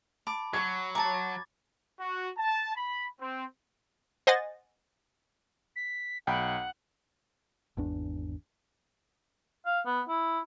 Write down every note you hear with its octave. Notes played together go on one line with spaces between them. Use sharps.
A5 B5 D6
F#3 C#6 G#6
C#5 A5 A#5 D6 A6
F#4
A5
B5
C4
C5 D#5 F#5 G#5 A6 A#6
B6
B1 F#5 G5 B5
G#1 E2 D4
F5
B3
E4